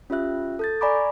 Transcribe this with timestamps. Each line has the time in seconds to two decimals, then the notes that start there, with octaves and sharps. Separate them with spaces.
0.10 C#4 F4 G4 E5 F#6
0.59 A4 G6 A6
0.81 D5 G#5 A#5 B5 C#6 D6